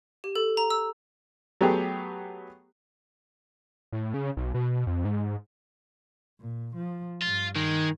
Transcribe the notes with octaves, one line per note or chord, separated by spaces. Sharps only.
G4
A4
A#5
E6
F#3 A3 B3 G4 G#4
A2
C#3
B1
B2
F2
G#2
A#2
F3
G2 F4
D#3 G#3